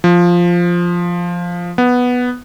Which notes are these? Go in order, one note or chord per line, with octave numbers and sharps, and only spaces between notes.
F3
B3